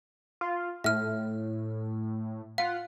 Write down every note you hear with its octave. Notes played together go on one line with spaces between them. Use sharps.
F4
A2 E5 F6
F4 F5 F#5